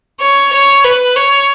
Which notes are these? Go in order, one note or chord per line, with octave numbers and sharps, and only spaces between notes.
C#5
C#5
B4
C#5